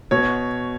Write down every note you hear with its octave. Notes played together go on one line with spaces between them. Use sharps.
B2 C#5